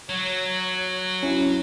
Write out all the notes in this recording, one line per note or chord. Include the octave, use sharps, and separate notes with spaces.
F#3 C#5
C#4 E4 F#4